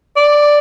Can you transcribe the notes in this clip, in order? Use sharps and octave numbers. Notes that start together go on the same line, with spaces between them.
D5